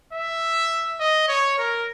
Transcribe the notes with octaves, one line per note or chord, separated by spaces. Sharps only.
E5
D#5
C#5
A#4